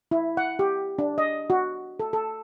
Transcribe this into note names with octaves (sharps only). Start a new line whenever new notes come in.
E4
F#5
G4
D4
D#5
F#4
A4
A4